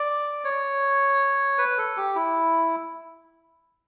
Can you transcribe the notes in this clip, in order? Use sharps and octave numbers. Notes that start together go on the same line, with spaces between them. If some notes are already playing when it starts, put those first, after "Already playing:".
Already playing: D5
C#5
B4
A4
G4
E4